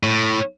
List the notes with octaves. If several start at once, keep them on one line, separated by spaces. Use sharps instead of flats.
A2